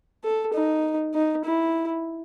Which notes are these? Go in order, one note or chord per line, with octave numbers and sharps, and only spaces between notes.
A4
D#4
D#4
E4